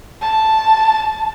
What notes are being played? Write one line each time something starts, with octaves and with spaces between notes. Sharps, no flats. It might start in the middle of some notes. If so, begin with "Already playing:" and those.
A5